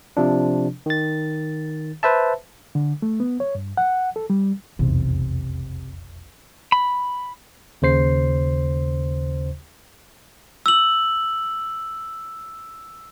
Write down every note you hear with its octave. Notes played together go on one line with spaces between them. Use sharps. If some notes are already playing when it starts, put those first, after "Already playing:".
C3 F3 D4
D#3 A6
B4 C5 E5 A5
D3
A3
B3
C#5
G2
F#5
A4
G3
F1 B1 E2 C3
B5
D#2 C#3 C5 C7
E6 F#7